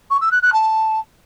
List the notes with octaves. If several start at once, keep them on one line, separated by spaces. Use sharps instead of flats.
C#6
E6
F#6
F#6
A5